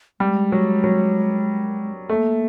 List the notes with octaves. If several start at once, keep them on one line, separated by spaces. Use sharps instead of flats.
G3 G#3
F#3
F#3
A3 A#3